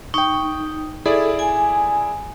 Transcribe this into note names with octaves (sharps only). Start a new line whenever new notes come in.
D#4 G5 C#6
E4 G#4 A4 D5
G#5